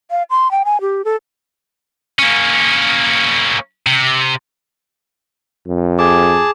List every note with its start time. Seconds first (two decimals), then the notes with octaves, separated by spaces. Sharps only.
0.11 F5
0.30 C6
0.51 G5
0.65 G#5
0.81 G4
1.05 A4
2.19 A#3 C#4
3.87 C3
5.68 F2
5.99 G#4 A5 D6